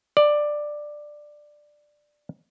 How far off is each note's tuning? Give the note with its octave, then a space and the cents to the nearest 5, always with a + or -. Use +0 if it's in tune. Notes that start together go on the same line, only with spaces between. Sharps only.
D5 +10